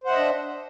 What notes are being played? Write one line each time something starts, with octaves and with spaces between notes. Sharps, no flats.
D4 C5 D#5 E5 F#5